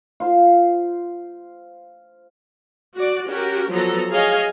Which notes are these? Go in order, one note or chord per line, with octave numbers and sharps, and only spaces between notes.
F4 C5 F5
F#4 D5
C#4 F#4 G4 A#4
F3 F#3 B3 A4 A#5
G#4 C#5 D#5 F5 G#5